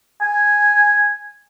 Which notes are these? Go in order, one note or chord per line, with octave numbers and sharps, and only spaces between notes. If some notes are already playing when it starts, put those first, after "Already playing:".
G#5